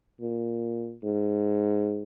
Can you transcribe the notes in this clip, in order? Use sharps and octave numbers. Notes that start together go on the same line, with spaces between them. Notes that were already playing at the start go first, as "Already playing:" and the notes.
A#2
G#2